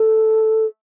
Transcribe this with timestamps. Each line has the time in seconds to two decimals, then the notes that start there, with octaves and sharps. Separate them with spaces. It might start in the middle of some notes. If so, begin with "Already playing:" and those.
Already playing: A4